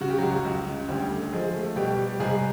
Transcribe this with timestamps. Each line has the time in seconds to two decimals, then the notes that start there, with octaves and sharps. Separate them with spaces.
0.01 C#3 F#4
0.10 G4
0.18 C#2 F#3 F#4
0.45 C#2
0.66 C#3
0.88 D2 G3 G4
1.10 A3
1.33 F3 G#3 G#4
1.54 A3
1.76 B2 G3 G4
1.99 G3
2.20 C2 G#3 G#4